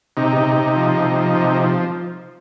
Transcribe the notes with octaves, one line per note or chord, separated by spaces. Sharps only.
C3 D#4
C3
C3
F3
C3
F3
C3
F3